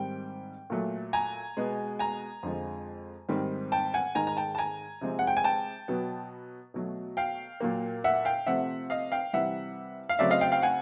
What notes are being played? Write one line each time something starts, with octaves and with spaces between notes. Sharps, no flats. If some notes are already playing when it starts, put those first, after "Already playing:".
Already playing: G#2 D#3 G3 C4 G5
A#2 F#3 A3
G#5 A#5
B2 G#3 B3
G#5 A#5
F2 D3 F3 G#3
G#2 D#3 G3 C4
G5 A5
F#5 G#5
G#2 D#3 G#3 G#5 A#5
A#5
G5 A5
A5
G#5 A#5
C3 F3 G#3 C4
F#5
G5
G#5
G5 A5
B2 F#3 B3
B2 F#3 A3
F5 G5
A#2 F#3 A#3
E5 F#5
F5 G5
C3 F3 A3 C4 E5 F#5
D#5 F5
F5 G5
C3 E3 G3 E5 F#5
F5
C#3 F#3 A3 C4 D5 E5
D#5 F5
F5 G5
F5 G5
F#5 G#5